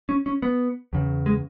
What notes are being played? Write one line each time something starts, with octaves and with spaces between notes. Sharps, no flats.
C#4
C#4
B3
E2 C#3
G#3